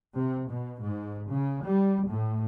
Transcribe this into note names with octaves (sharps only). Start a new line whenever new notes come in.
C3
B2
G#2
C#3
G3
A2